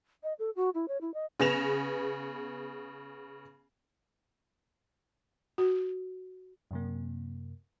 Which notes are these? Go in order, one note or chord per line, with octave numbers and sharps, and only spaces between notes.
D#5
A4
F#4
E4
C#5
E4
D#5
C#3 B3 G#4 A#6 E7 F7
F#4
F#2 C3 A#3